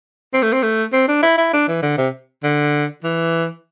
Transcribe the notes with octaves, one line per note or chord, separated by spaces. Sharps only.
C4
A3
C4
A3
C4
D4
E4
E4
D4
E3
D3
C3
D3
E3